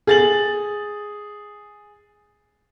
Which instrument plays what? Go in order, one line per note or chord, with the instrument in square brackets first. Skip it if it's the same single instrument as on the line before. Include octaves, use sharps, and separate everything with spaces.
[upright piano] G#4 A6 F#7